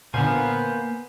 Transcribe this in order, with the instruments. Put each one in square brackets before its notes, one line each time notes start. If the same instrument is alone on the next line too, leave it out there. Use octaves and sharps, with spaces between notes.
[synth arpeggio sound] A#2 D3 [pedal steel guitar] A#3 C5 F5 [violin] B3 [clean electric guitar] G#5